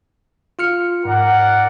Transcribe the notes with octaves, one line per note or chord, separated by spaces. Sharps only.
F4 F6 C#7
G#2 A#4 D5 F#5